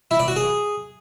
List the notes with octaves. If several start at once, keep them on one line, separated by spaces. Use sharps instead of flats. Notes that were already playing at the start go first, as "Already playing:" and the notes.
E4
D5
F#4
G#4